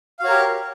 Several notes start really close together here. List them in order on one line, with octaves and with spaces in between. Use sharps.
F5 F#4 C#5 A#4 G4